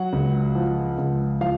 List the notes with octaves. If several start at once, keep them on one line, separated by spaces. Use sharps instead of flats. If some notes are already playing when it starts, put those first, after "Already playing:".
Already playing: F#3 F#5
C#2
F3
C#2
F3 F5